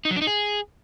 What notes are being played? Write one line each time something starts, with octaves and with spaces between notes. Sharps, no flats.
D#4
F#3
D4
D#4
G#4